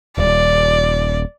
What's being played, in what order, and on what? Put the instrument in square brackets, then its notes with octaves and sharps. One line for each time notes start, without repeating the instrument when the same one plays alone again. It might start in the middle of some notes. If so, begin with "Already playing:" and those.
[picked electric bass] D#1 [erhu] D5